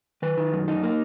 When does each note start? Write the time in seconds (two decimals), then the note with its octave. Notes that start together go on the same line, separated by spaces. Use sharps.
0.22 D#3 B4
0.37 D#3
0.53 F#2
0.68 D#4
0.83 A#3